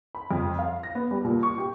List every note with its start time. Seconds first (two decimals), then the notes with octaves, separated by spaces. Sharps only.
0.15 B5
0.31 F2
0.59 F5
0.83 A#6
0.95 B3
1.11 G3
1.24 A#2
1.43 C#6
1.58 G4